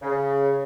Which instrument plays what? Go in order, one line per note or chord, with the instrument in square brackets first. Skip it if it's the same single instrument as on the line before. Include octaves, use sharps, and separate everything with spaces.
[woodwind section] C#3